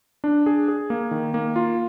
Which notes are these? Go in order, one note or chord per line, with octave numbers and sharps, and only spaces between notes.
D4
G#4
G#4
A#3
D#3
A#3
F4